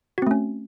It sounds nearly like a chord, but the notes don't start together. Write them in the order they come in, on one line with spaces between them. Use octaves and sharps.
F#4 C4 A3 C#4